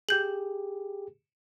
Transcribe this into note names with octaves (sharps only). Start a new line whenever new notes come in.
G4 G#4 G6 F#7